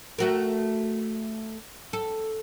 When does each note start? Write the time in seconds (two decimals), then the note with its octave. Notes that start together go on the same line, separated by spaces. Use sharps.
0.18 A3 F#4 A#4
1.93 A4